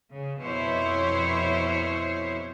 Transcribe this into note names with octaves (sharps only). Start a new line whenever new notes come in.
C#3
F2 B2 E4 C5 C#5